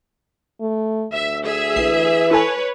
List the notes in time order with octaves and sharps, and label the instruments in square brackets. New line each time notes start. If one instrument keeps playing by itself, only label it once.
[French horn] A3
[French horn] D2 [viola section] E5
[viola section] G#4 E5
[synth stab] A#1 C7 [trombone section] E3
[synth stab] E4 A4 G#5 [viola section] B4 C#5